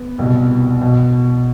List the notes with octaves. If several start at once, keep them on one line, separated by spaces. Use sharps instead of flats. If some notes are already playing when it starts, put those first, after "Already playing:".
Already playing: B3
C2 B2
B2